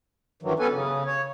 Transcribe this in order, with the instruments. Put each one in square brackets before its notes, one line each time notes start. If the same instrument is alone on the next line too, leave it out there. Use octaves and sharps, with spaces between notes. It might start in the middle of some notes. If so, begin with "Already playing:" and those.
[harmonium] G2 D#3 E3 F#3
G2 B3 C#4 A4 B4 G#5
C#3
C#5